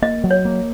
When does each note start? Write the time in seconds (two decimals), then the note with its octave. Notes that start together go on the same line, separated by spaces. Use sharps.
0.02 A#3 D#5
0.24 F#3
0.31 C#5
0.45 A#3